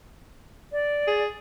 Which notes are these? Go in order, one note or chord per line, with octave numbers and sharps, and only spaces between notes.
D5
G#4